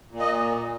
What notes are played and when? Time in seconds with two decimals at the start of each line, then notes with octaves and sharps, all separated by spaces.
0.11 A#2
0.19 D#5